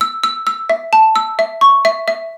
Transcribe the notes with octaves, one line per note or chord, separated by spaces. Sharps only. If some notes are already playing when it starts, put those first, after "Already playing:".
E6
E6
E6
E5
A5
E6
E5
C#6
E5
E5